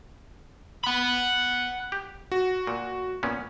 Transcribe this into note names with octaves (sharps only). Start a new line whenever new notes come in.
F#5 B5
G4
F#4
A#2
A#2 B3 C#4